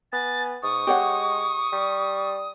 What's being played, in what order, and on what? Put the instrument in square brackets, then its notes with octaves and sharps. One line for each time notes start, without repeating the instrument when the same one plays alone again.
[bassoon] B3 [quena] G#5 [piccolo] A6
[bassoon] G#2 [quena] C#6 [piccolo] D#6
[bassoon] G#3 [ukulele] G4 C#5 F#5
[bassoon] G3